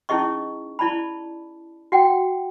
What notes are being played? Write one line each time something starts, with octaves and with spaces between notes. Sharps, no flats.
C#4 D#4 E4 G#4 D#5 C#6
E4 D5 A5 B5
F#4 F#5 G5